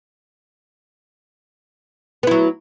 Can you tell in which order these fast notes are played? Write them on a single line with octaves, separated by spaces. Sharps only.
B3 E4 F#3